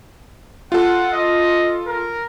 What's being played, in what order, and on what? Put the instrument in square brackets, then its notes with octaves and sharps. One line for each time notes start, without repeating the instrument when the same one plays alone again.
[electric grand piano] F4 A4 [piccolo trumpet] F#5
[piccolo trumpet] D#5
A#4